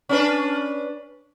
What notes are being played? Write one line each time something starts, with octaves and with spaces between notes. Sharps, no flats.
C#4 D4 B4